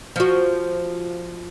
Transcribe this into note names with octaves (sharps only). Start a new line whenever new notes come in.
F3 F#4